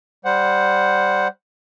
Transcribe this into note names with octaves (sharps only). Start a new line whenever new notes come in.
G3 C5 F#5